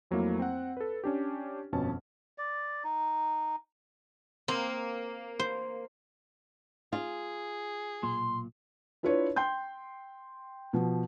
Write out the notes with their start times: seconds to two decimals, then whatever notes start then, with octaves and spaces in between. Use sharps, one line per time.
0.11 F2 F#3 A3 A#3 E4
0.39 C4 F#5
0.77 A4 B4
1.04 C#4 D4 G4
1.72 G1 F2 B2 C#4 A5
2.38 D5
2.84 D#4
4.48 A#3 C4
5.39 C5
6.93 F4 G#4
8.03 B1 A#2 C6
9.03 D4 E4 F4 B4 C#5
9.36 G5 C6 G6
10.73 B2 F3